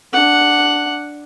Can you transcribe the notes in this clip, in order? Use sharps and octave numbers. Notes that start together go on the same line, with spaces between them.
D4 F#5